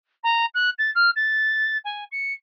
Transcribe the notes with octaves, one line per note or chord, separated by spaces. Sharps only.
A#5
F#6
A6
F6
A6
G#5
C#7